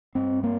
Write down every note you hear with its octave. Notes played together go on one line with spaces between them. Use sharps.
G2 C4
A#3